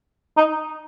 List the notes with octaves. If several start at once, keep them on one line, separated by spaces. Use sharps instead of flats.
D#4